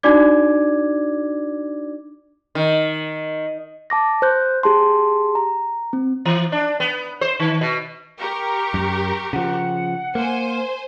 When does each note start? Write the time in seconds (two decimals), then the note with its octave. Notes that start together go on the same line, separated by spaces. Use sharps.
0.03 D4 D#4 F#4 D5 D6 G#6
2.55 D#3
3.90 A5 D6 A#6
4.22 C5 F#6 G6
4.63 G4 G#4 A5 C6
5.35 A#5
5.93 C4
6.25 E3
6.52 D4
6.80 B3
7.21 C5
7.40 D#3
7.61 B2
8.19 G4 A#4 C#6
8.74 F#2
9.33 C#3 F3 F#5
10.15 A#3 C5 G#5